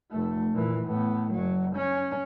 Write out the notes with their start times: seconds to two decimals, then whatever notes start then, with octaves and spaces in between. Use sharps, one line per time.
0.11 F1 A3
0.53 A#2 E3
0.85 A2 B3
1.32 F#1 F#3
1.76 C#4